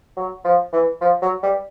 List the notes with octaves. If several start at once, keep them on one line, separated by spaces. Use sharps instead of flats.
F#3
F3
E3
F3
F#3
G3